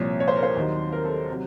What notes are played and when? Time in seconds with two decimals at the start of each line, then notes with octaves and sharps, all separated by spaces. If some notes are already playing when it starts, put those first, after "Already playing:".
Already playing: C2 A#2 F3 C#5
0.20 C#5
0.28 C5
0.36 A#4
0.43 C5
0.56 D#2 D#3 F#3
0.92 A#4
1.05 A4
1.30 C3 F#3